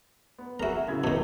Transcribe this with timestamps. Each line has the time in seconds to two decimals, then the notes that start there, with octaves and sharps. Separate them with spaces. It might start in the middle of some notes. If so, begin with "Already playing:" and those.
0.38 B3
0.60 E4 F#4 G#4 A#4 A#5
0.88 C#3 E4 G#6
1.04 C2 B2 D#3 A5